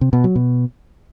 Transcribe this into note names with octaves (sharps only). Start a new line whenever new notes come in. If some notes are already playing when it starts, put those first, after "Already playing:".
C3
B2
F#3
B2